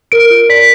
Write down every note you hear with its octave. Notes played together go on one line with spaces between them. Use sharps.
A#4 D7
F4
D5 B6